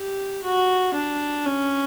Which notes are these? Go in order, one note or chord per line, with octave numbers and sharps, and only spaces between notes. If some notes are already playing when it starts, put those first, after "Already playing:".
Already playing: G4
F#4
D4
C#4